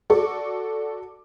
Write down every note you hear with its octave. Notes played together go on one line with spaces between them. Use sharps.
F#4 A4 D5 C#6 D6